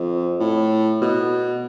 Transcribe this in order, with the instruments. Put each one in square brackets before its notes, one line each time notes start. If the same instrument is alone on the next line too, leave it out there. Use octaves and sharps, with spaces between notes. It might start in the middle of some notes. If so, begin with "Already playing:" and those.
Already playing: [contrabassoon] F2
A2
B2